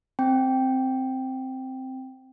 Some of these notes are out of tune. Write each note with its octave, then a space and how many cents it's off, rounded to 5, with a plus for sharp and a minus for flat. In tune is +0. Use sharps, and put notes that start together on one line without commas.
C4 +0 G5 +0